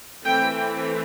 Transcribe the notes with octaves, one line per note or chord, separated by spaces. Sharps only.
E3 A3 C4 G5